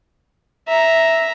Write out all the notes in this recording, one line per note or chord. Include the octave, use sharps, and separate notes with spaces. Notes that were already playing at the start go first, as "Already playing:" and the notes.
E5 A#5